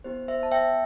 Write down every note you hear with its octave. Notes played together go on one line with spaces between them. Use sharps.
B3 E4 G4 C5
C5 E5
A5
E5 G5